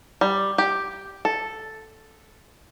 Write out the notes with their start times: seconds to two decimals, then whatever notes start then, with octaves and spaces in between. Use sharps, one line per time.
0.21 G3
0.58 G4
1.25 A4